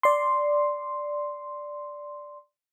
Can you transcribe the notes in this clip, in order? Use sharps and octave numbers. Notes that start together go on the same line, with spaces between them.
D5 C6